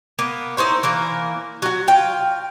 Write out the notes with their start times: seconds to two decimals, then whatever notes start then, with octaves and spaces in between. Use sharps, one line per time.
0.19 A#3 B3
0.57 D#4 E4 C5 C#5
0.83 E3 A#3 A#4
1.62 F#3 F#4
1.88 F4 G5